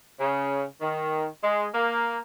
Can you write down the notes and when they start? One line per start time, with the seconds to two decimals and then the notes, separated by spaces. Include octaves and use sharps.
0.19 C#3
0.81 D#3
1.43 G#3
1.74 A#3